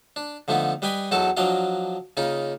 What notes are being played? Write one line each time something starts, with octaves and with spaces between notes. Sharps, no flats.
D4
D3 F3 A3 B3 D#4
G3 B4 D#5 G5 G#5 B5
E2 F#3 D#4 F#4 A4 A5
F3 F#3 D4 A#4 D#5 F5
C#3 A#3 C#4 D#4 F4